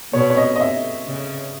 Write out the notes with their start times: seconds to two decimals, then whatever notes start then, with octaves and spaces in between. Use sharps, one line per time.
0.13 B2 C#5
0.30 C#5
0.37 D#5
0.56 D#5
0.60 E5
1.07 C#3